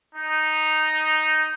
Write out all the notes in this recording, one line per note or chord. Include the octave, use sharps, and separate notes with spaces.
D#4